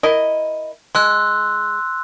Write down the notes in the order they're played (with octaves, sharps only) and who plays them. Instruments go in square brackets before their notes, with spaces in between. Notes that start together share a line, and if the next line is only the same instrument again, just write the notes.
[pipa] E4 A#4 D#5
[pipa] G#3 [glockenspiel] C6 E6 F#6